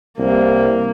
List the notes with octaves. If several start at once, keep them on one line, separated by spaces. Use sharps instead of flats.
C2 A#3